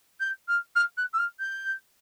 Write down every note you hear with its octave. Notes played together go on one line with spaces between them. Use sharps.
G6
F6
F6
F#6
E6
F6
G6